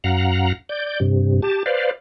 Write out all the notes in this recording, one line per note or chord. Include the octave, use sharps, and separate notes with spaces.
F#2 F5 F#5 A#5
D5 G6
G2 C3
G4 A5
B4 C5 D5 F5